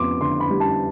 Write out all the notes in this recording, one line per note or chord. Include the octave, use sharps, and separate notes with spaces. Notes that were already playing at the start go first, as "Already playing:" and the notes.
Already playing: F2 B3 C6 D6
D3 C6
B5
G3
A5